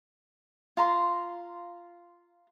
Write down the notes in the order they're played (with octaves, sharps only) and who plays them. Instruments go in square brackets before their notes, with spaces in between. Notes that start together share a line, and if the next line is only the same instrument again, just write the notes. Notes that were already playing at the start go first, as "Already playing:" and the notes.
[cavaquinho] F4 A#5 C6